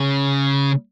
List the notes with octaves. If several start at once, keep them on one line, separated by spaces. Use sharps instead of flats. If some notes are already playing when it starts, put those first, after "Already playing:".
Already playing: C#3